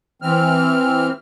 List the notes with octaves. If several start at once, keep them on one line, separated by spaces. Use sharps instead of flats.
E3 C4 F6